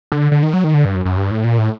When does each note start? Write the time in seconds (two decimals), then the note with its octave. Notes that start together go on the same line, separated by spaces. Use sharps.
0.12 D3
0.32 D3
0.43 D#3
0.53 F#3
0.64 D#3
0.74 D3
0.85 G2
0.95 F#2
1.05 F#2
1.17 G2
1.31 A2
1.44 A#2
1.58 A2